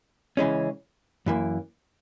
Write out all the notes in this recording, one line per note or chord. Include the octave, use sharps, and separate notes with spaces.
C#3 E3 G#3 C#4
F#2 E3 A#3